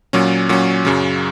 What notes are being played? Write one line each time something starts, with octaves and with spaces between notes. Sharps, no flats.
A#2 F#3 C#4
A#2 F#3 C#4
F#2 C#3 F#3